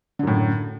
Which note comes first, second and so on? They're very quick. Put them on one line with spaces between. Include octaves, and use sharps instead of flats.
D3 F#2 A2